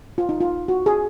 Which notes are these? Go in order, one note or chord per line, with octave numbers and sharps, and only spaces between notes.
F4
D#4
F4
F#4
G#4